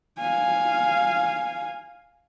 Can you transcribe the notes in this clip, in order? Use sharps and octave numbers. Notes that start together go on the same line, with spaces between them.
F5 G#5